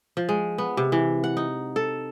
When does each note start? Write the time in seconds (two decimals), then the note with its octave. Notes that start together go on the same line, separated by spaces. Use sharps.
0.17 F3
0.29 G#3
0.58 B3
0.77 C3
0.92 E3
1.24 F#5
1.37 D#4
1.76 A4